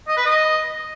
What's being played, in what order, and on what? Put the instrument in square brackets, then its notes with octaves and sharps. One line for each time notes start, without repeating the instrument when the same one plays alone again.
[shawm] D#5
B4
D#5